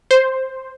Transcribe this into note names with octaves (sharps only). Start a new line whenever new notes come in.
C5